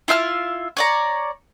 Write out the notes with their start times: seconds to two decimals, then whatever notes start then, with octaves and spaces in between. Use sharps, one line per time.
0.08 E4 F4 E5 F6
0.77 C#5 D5 A#5